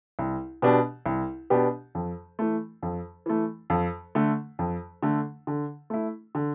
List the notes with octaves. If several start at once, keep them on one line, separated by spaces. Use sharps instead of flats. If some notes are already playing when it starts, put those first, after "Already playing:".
C2
B2 B3 D4 G4
C2
B2 B3 D4 G4
F2
E3 A3
F2
E3 A3
F2
D3 A3
F2
D3 A3
D3
A3 E4
D3